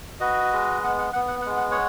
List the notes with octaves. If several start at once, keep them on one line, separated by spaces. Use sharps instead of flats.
F#4 B4 D#5
G#3
B3 F#5
F#5
B3 F#5
F#5
F#5
G#3
F#5
C#5 F#5